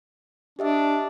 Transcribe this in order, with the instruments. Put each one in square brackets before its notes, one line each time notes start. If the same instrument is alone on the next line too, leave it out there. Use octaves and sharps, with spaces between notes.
[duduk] D4 [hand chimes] G4 D#5 E5